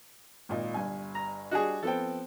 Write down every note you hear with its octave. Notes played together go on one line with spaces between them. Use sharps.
G#1 A#2 D#5
G1 G2 G#5
A#5
G3 D4 F#4 G#4 D#5
F3 B3 C4 A4 G5